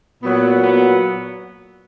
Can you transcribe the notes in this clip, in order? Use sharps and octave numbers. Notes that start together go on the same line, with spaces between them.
A#2 F#3 B3
B3